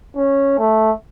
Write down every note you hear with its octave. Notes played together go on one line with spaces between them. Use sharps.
C#4
A3